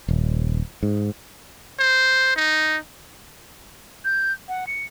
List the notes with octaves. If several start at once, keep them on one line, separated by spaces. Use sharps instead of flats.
D#1
G#2
C5
D#4
G6
F#5
C#7